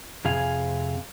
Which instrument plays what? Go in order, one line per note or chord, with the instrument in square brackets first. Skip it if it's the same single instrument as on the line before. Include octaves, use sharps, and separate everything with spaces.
[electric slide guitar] F2 C3 G#4 F5 G#5